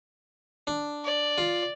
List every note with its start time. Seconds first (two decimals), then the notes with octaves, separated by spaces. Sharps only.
0.67 D4
1.04 D5
1.38 F4